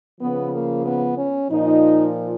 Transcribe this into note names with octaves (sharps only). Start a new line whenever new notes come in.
C#3 F3 B3
A#3
B3
C#4
A#2 F3 D#4